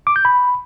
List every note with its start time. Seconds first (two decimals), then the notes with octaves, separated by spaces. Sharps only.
0.07 D6
0.16 G6
0.25 B5